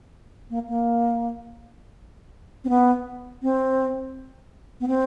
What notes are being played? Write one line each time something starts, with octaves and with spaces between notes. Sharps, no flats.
A#3
A#3
C4
B3
C4
B3
C4